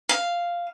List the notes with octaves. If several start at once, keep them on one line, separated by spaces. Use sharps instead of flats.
F5